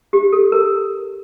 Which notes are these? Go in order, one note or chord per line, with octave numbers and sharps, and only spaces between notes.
G4
A4
A#4